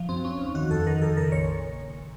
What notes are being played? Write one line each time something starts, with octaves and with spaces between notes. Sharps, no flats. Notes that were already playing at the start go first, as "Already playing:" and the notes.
Already playing: F3
F#2 C4
F3 C#4
D#2
D#3 F#4
F2 A4
D#3 A#4
F2 A4
C#3 A#4
A#1 C#5